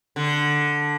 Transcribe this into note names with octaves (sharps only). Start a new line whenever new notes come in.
D3